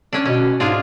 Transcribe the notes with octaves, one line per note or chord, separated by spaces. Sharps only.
C#4 D4
B2 C#4
G#2 D4 F4 G#4